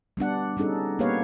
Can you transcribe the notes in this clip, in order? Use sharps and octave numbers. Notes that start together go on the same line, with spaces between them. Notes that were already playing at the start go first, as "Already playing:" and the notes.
G3 B3 D4 F#5
G3 C#4 D#4 G#4 A4
A#3 B3 G4 B4 C#5 F5